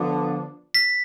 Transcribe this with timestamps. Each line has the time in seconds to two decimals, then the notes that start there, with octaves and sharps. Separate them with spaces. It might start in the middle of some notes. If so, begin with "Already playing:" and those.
Already playing: D3 F3 B3 D4
0.75 B6